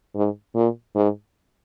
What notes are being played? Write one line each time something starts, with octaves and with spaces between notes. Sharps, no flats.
G#2
A#2
G#2